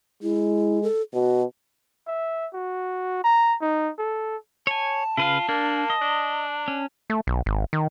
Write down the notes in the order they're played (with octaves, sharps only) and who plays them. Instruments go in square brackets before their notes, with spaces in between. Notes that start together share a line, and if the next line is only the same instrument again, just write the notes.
[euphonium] G#3 [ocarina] E4
[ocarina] A4
[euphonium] B2 [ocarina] F#4
[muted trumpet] E5
F#4
A#5
D#4
A4
[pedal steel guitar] C#5 G#5 [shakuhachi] A5
[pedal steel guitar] C#3 B4 F5 [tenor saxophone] F4
[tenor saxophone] A#3 [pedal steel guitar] D4
[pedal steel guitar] D#5
[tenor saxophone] D4
[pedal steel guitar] C#4
[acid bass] A3
B1
G#1
D#3